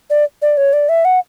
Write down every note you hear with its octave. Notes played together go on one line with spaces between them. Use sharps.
D5
D5
C#5
D5
E5
F#5